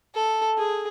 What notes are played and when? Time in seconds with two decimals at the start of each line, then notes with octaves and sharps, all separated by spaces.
0.14 A4
0.57 G#4